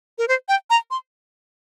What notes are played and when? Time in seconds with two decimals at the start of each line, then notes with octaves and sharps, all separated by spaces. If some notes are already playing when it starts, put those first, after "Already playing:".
0.18 A#4
0.28 C5
0.48 G5
0.70 A#5
0.91 C6